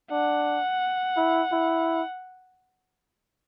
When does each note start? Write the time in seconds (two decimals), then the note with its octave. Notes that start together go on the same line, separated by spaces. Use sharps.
0.11 D4 F#5
1.17 E4
1.53 E4